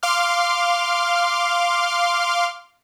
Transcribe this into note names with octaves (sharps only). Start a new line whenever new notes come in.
F5 C6 D6 F6